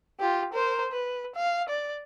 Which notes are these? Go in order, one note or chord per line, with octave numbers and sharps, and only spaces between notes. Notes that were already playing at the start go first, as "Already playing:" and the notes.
F4 G4
A#4 C5
B4
F5
D5